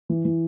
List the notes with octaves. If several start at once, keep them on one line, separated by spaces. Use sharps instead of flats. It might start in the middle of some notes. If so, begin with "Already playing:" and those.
E3
E3